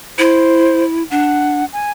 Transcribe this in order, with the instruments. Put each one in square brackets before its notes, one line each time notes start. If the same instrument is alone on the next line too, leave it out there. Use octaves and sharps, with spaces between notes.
[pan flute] E4 [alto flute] C5
[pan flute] D4 [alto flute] F#5
[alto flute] G#5